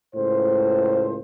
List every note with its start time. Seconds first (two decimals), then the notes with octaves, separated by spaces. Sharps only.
0.15 C#2 A2 C5